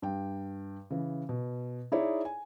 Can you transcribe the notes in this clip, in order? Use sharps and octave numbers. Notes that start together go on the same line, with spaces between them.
G2 G5
C#3 E3
B2
D#4 E4 G#4 C#5 D5
G#5